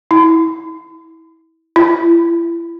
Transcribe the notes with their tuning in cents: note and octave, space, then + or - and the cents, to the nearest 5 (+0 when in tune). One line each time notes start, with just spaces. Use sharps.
E4 -25
E4 +35